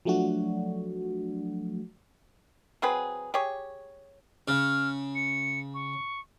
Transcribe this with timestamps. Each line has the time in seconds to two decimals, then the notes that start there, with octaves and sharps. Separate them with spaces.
0.05 F3 F#3 A3 D4 F#4
2.82 F#3 C4 G#4 B4
3.34 G4 G#4 C#5
4.48 C#3 F6
5.15 C#7
5.74 C#6